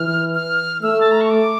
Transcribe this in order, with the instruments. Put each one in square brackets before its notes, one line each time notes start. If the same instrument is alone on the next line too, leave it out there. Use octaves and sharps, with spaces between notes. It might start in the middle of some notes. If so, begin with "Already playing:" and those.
Already playing: [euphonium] E3 [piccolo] F6
[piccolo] F6
[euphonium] A3 [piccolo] E6
[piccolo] A5
A#5
C#6
D6